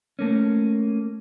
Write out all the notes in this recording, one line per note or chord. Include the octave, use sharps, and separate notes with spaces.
A3 A#3 C#4